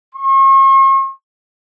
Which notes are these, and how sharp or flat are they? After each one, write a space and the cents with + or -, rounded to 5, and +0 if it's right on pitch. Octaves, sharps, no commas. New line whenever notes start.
C#6 -45